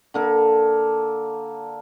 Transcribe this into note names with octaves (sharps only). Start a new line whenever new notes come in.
D3 A#3 A4